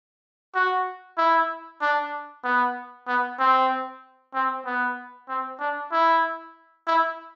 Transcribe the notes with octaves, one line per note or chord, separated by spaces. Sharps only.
F#4
E4
D4
B3
B3
C4
C4
B3
C4
D4
E4
E4